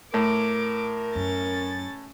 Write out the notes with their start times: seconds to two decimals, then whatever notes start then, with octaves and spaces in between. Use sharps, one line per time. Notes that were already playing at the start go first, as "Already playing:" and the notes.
0.14 A2 A#4 D6
1.15 F#2 C#4 A6